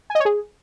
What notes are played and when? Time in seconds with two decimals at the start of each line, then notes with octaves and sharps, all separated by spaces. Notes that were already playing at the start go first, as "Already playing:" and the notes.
0.10 G#5
0.15 D#5
0.20 C#5
0.25 G#4